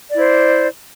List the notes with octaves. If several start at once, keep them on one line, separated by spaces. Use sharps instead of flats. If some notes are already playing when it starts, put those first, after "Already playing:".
E4 C5 D5